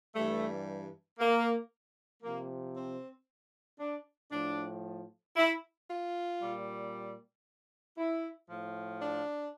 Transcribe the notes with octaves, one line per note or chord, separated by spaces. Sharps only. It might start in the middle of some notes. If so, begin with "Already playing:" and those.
G2 E3 G3 A3
A#3
C3 F3 A#3
C4
D4
A2 F3 D4
E4
F4
A#2 G3
E4
A2 F3
D4